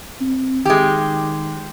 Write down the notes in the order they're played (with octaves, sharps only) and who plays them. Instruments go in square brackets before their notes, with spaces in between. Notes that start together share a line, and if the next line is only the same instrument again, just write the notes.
[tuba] C4
[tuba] D#3 [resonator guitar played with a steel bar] G#3 G4